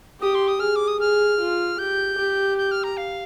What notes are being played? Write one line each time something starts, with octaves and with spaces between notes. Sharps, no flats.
G4 D#6
C6
D#6
G#4 F6
D6
D#6
G#4 F6
F4
G4 G6
G4
G6
F6
A#5
F5